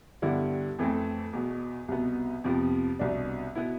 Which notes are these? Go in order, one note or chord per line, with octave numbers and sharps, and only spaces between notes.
G2 D3 G3 B3 E4
F2 E3 A3 C4
E2 B2 B3
C2 B2 B3
F2 C3 F3 B3
C2 B2 B3 D4
B2 B3 E4